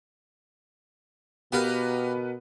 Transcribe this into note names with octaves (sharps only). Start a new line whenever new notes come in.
B2 B3 G4 A#4 B4 F5 A#5